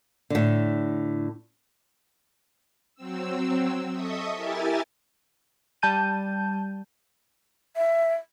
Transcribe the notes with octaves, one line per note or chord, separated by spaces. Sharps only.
A2 D3
F#3 C4 E6
A4 D#5 E5 C#6 D#6
E4 G4 A#4 E5 G#5 A6
G3 A5 G6 D#7
E5